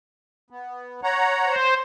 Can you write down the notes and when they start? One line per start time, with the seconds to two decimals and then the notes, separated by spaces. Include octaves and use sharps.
0.50 B3
1.03 C#5 F#5 A#5
1.45 C5